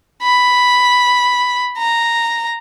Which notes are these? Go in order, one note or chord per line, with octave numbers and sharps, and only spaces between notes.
B5
A#5